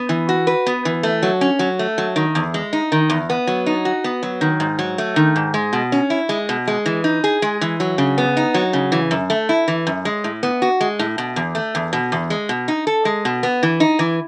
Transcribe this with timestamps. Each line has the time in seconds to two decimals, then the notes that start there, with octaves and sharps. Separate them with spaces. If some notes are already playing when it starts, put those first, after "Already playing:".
Already playing: B3
0.09 E3
0.29 F#4
0.47 B4
0.66 B3
0.85 E3
1.03 A3
1.23 F#3
1.41 C#4
1.59 F#3
1.79 A3
1.98 F#3
2.16 D#3
2.35 E2
2.54 G#3
2.73 D#4
2.92 D#3
3.10 E2
3.30 B3
3.47 F#3
3.66 D#4
3.85 F#4
4.04 B3
4.23 F#3
4.41 D#3
4.60 G#2
4.79 F#3
4.98 A3
5.16 D#3
5.36 G#2
5.54 G#3
5.73 B2
5.92 C#4
6.10 E4
6.29 G#3
6.49 B2
6.68 G#3
6.86 E3
7.04 D#4
7.24 G#4
7.42 G#3
7.61 E3
7.80 F#3
7.98 C#3
8.18 B3
8.37 D#4
8.54 F#3
8.73 C#3
8.92 E3
9.11 F#2
9.30 A3
9.49 E4
9.68 E3
9.87 F#2
10.05 G#3
10.24 A2
10.43 B3
10.62 F#4
10.81 G#3
10.99 A2
11.18 B2
11.36 E2
11.55 A3
11.75 E2
11.93 B2
12.12 E2
12.30 G#3
12.49 B2
12.68 D#4
12.87 A4
13.05 G#3
13.25 B2
13.43 B3
13.63 E3
13.80 D#4
13.99 E3